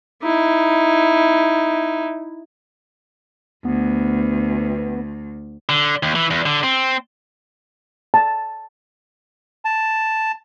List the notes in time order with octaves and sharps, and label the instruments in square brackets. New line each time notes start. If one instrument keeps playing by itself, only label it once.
[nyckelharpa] D#4 E4
[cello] D2 [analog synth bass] B3
[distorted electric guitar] D3
D#2
E3
E2
D3
C4
[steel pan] A5
[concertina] A5